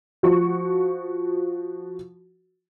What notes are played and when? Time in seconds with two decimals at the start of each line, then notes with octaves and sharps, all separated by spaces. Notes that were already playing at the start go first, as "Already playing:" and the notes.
0.23 F3 F#4 C#6